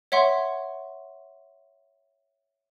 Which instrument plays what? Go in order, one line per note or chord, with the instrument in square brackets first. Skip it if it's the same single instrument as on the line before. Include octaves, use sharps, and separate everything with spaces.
[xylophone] C#5 E5 F#5 C6 C#6